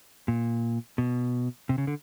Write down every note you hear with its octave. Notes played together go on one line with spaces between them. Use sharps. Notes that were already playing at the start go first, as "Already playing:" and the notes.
A#2
B2
C3
C#3
D3